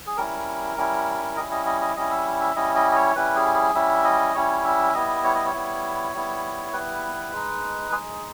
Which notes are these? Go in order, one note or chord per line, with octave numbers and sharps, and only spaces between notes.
G#4
G3 C#4 E4 A#4
G3 C#4 E4
G3 C#4 E4 D#5
D#5
D#5
D#5
G3 C#4 E4 D#5
E5
E5
G3 C#4 E4 D#5
D#5
D#5
C#5
G3 C#4 E4 B4
G#4
G#4
G3 C#4 E4 E5
D#5
G3 C#4 E4 C#5
E5
G3 B3 E4 D#5
C#5
D#5
C#5
G3 B3 E4
G3 B3 E4
G3 B3 E4 B4
G#3 D#4
G#3 D#4 G#4